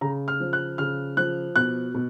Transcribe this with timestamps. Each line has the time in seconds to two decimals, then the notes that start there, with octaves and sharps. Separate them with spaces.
0.01 C#3 A#5
0.28 F6
0.40 F3
0.53 F#6
0.78 C#3 F6
1.17 F3 F#6
1.56 B2 F#6
1.94 B2